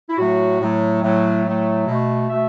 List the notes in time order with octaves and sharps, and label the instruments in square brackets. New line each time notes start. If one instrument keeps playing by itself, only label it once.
[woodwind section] E4
A2 F#3 A3 F#4
A2 F#3 A3
A2 F#3 A3
A2 F#3 A3
B2 A3
B2 A3 E5